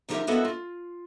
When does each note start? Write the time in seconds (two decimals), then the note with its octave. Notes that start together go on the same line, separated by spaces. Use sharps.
0.09 D2 F3 D#4 G4 A#4 E5
0.27 A#3 B3 E4 F#4 A4 D#5
0.45 F4